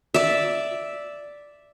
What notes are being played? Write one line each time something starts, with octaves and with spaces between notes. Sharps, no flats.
D5 E5